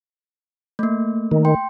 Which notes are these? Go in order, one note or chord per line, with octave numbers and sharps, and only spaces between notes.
A3 A#3
D#3
G5 C6